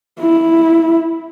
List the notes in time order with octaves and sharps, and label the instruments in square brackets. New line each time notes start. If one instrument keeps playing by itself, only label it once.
[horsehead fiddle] E4